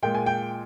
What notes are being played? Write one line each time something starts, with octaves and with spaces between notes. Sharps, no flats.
A#2 G#3 G5
G#5
G5